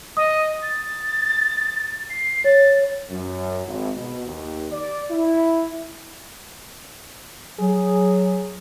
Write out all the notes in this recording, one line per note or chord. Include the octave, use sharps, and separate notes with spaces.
D#5 D#6
A6
C7
C#5 A6
F#2
G#1
B2
D#2
D5
E4
F#3 G#4